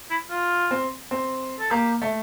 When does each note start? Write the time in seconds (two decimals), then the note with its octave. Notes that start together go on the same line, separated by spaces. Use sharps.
0.10 E4
0.31 F4
0.71 C4
1.11 C4
1.59 A4
1.71 A#3 G4
2.02 A3